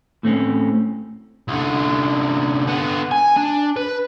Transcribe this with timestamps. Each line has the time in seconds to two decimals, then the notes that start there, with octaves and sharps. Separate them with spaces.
0.23 A2 A3 C4 C#4
1.48 C2 D3
2.67 D3 B3
3.11 G#5
3.36 D4
3.76 B4